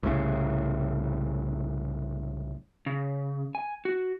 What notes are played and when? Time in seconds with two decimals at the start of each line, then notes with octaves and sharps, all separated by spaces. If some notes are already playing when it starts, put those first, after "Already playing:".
0.03 C2 A2 C#3
2.86 C#3
3.55 G#5
3.85 F#4